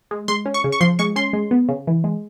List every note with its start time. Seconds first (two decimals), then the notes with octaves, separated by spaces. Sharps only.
0.11 G#3
0.28 G#3 C6
0.46 C#4
0.54 C#6
0.64 C#3
0.72 C#6
0.81 F3 C6
0.99 G#3 C#6
1.16 C#4 C6
1.33 G#3
1.51 B3
1.69 C#3
1.87 E3
2.04 G#3